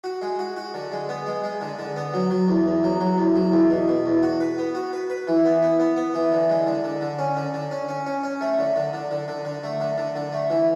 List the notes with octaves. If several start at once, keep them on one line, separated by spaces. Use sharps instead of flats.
F#4
G#3
F#4
F#4
D3
G#3
B3
G#3
G#3
D3
D3
B3
F#3
F#3
E2
E2
F#3
F#3
E2
F#3
E2
B2
B2
E2
F#4
B4
B3
F#4
B4
B4
E3
B3
B3
B3
B3
E3
D3
G#3
D3
D3
D3
C#4
D3
D3
C#4
C#4
C#4
C#4
A3
D3
D3
D3
D3
D3
D3
A3
D3
D3
D3
A3
E3